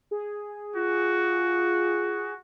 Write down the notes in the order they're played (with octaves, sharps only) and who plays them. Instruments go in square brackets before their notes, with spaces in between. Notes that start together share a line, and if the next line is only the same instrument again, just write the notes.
[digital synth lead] G#4
[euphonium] F4 [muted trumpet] F#4